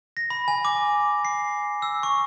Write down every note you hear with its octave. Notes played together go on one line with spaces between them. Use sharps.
A#6
B5
G#5
D6
C7
E6
C#6